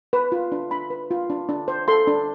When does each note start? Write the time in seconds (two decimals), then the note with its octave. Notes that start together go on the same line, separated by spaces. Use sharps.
0.13 B4
0.32 F4
0.52 D4
0.71 D4 B5
0.90 B4
1.11 F4
1.30 D4
1.49 D4
1.68 C5
1.88 A4 C6
2.07 D4